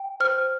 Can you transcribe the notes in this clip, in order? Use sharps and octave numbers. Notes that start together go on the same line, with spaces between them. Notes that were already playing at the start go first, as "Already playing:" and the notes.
Already playing: G5
C5 F6